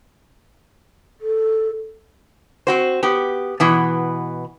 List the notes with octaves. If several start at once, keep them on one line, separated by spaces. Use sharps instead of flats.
A4
C4 F#4 C5
B3 G4
B2 E3 B3